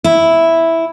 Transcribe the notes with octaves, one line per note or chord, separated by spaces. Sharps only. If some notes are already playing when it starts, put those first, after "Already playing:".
E4